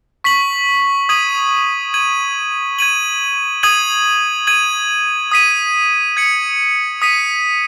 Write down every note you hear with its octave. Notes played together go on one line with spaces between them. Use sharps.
C#6 B6 F#7
D#6 G#6 D#7 F#7
G#6 D#7 F#7
G#6 D#7 F#7
D#6 G#6 D#7 F#7
G#6 D#7 F#7
D#6 B6 D#7
G#6 C#7 F#7
D#6 B6 D#7